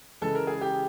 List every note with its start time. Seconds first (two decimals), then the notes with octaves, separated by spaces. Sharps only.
0.21 C#3 E3 G#3 A4
0.35 A#4
0.47 G#4
0.61 G4